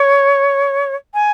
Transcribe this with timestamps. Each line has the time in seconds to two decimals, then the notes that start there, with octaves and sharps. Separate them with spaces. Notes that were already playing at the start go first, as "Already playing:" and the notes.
Already playing: C#5
1.14 G#5